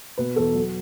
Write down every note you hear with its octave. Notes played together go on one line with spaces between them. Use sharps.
B2 B4
E2 A4
F#3